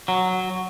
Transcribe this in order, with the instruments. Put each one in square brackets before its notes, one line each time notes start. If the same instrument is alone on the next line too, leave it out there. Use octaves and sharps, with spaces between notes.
[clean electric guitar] F#3